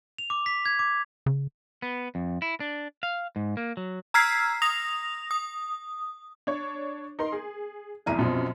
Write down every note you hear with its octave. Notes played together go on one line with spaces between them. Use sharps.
F7
D6
B6
G#6
D6
C#3
B3
F2
E4
D4
F5
G#2
A#3
F#3
A#5 E6 F6 G#6 B6 C7
D#6 A#6 F7
D#6
D4 C#5
D#4 A#4 C6
G#4
F1 B1 E2 E4 A#5 D#7
F#2 B2 F3 C4